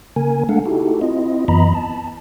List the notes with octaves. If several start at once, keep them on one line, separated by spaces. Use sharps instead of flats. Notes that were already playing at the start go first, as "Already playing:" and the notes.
C#3 A#3 A#4 G#5
G#3 A3 D4 A4 F5 F#5
D#4 E4 F#4 G4 A4
C4 E4 F4 D#5
F#2 E3 B3 D#5 A#5 B5
A5